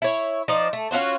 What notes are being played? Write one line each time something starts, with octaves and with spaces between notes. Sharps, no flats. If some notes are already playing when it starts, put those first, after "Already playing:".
E4 C#5
F3 D#4 C5 D5
A3
C#4 F4 F#4 C5